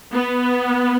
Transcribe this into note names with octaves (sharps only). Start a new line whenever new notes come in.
B3